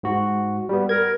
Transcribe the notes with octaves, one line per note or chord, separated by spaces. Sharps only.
G#2 F#4
G3 B3
A#4 G#6